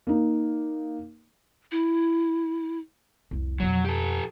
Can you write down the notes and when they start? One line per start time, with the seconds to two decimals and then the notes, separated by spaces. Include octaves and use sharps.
0.07 A#3 D#4
1.72 E4
3.31 F1 C2
3.60 F2 B2 F#3
3.85 G4 A4